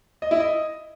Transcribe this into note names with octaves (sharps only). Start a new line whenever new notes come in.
D#5
E4
D#5